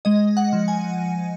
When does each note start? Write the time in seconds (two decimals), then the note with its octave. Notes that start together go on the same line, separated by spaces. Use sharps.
0.05 G#3 D#5
0.37 F#5
0.53 F3
0.68 G#5